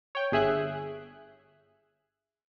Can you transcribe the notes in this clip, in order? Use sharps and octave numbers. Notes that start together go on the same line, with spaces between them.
C#5 G5
G1 G#4 E5 F#6